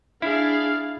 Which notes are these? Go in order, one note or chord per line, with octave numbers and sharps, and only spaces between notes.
D4 E4 G#4 F5